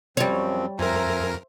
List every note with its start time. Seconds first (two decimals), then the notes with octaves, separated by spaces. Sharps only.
0.17 F#2 F3 G3 C4 C#5
0.79 F2 A#4 C5 E5 G#5 A#5